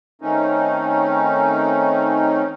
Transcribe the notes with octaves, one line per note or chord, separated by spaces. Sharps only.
D#3 A3 C4 C#4 D#4